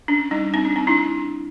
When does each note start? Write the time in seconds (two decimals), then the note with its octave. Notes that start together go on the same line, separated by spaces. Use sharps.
0.08 C#4 D4
0.31 G3 D#4
0.54 C4 D#4
0.65 D4
0.76 C4 D#4
0.87 D4 E4